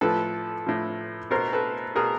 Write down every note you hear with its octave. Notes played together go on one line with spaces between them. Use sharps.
A2 F3 A4 B4
A2 F3
B2 A#4 C5
A4 B4
B2 G#4 A#4